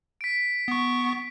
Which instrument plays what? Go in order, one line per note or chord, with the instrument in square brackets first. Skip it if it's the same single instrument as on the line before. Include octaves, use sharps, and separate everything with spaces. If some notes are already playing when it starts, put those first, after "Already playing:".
[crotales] B6 D7
[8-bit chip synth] B3 C#6